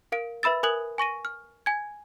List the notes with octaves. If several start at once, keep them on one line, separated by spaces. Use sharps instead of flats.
A#4 F5 D7
B4 E5 B5 E6 A6
A#4 G#5 D#6 F#6 G#6 F#7
G#5 C#6 A#6 D#7
F6
G#5 G#6